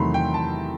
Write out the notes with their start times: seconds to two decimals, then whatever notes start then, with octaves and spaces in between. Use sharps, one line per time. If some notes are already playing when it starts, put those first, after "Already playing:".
Already playing: E2 C3 D#3 F#3 A3 B5 C6
0.14 G5
0.34 A5